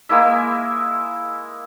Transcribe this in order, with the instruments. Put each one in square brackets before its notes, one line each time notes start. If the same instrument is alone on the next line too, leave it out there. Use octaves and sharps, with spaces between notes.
[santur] G#3 A#3 E4 E5